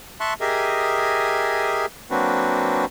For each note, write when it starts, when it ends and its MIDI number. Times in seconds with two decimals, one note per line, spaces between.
0.20 0.34 76
0.20 0.34 81
0.20 0.34 84
0.20 0.34 85
0.20 0.34 90
0.41 1.86 67
0.41 1.86 68
0.41 1.86 70
0.41 1.86 75
0.41 1.86 76
0.41 1.86 80
2.11 2.85 54
2.11 2.85 58
2.11 2.85 60
2.11 2.85 62
2.11 2.85 66
2.11 2.85 71